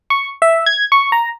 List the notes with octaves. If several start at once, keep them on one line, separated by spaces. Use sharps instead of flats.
C#6
E5
G#6
C#6
A#5